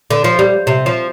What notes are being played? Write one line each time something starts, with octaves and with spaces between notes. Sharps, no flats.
D3
F3
G3
C3
F3